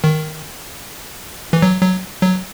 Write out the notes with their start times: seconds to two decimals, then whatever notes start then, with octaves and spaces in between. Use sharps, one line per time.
0.04 D#3
1.53 E3
1.62 F#3
1.82 F#3
2.22 F#3